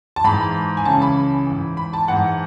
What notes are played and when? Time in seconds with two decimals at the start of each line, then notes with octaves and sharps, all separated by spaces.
0.16 A5
0.24 G#2 E3 B5
0.77 G#5
0.85 C#2 C#3 E3 A5
1.02 B5
1.47 G#2 E3
1.77 B5
1.93 A5
2.08 G#2 E3 F#5